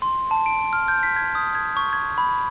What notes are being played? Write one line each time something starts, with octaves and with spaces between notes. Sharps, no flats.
C6
A5
D7
F6
G6
B6
G#6
D#6
G#6
C#6
G#6
B5